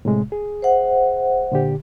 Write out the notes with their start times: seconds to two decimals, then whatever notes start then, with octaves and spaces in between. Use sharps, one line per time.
0.05 A2 C3 G#3
0.32 G#4
0.62 C5 E5 F#5
1.52 A#2 D3 G4